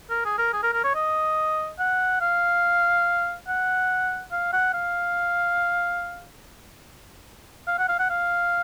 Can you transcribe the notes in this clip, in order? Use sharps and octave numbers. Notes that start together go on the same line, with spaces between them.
A#4
G#4
A#4
G#4
A#4
A#4
C#5
D#5
F#5
F5
F#5
F5
F#5
F5
F5
F#5
F5
F#5
F5